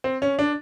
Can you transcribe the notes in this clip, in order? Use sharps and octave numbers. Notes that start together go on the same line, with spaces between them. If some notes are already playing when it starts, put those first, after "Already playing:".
C4
C#4
D4